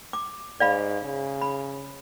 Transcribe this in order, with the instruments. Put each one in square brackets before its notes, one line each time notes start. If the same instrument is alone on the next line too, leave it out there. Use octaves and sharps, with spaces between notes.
[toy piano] D6
[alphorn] G#2 [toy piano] D5 F5 B5
[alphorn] C#3
[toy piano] B5